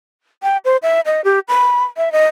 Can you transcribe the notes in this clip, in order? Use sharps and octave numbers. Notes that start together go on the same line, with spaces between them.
G5
C5
E5
D#5
G4
B5
E5
D#5